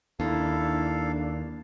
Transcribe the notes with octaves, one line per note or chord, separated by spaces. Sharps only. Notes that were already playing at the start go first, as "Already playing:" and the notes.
D#2 D4 E4 A4 F5